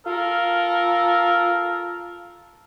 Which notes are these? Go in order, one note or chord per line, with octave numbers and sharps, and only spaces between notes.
F4 A4 A#4 F5